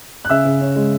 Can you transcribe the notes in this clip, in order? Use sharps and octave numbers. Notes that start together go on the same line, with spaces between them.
F#6
C#3 E5 E6
C#3
C#4
G#3